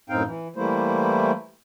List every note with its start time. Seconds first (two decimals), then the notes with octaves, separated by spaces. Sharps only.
0.10 F#2 A2 C4 D#4 F5 G5
0.24 E3
0.56 E3 G3 A3 A#3 E4 C5